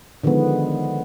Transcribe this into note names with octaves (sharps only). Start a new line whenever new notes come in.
D3 D#3 F3 G#3 B3